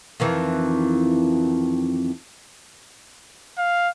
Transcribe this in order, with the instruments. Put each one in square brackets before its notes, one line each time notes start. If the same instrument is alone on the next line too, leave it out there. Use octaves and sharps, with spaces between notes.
[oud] F2 D#3 E3
[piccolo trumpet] F5